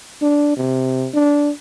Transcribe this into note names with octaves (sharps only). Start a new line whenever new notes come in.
D4
C3
D4